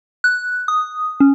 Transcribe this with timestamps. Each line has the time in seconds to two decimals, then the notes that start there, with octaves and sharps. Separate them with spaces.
0.24 F#6
0.68 D#6
1.20 C#4